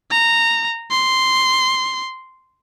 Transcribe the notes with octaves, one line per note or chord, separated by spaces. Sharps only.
A#5
C6